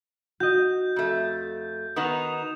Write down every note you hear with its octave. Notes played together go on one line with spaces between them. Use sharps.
F#4 D#5 G6
F2 A3
D#3 B3 D#4 D#6 E7 F7